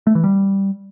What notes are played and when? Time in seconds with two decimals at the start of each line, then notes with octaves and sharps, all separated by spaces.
0.07 A3
0.15 E3
0.24 G3